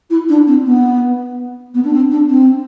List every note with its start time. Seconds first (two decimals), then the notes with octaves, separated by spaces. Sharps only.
0.10 E4
0.28 D4
0.47 C4
0.65 B3
1.74 B3
1.84 D4
1.92 C4
2.11 D4
2.29 C4